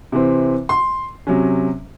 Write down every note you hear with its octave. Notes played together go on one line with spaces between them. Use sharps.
C3 E3 C4
C6
C3 F#3 C#4